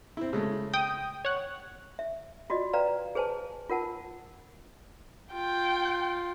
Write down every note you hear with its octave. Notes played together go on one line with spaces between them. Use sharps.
C4 E4
C#3 G#3 A3
G5 D#6
C#5 F#5
E5
F4 F#4 D5 D#5
B4 D5 F5 G5 A#5
G#4 B4 C5 G#5 A5
F4 A#4 F#5 A5
F4 G5